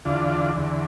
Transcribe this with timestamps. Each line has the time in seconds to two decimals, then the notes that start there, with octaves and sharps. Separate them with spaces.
0.05 E2 D3 D4 F4
0.55 E2 D3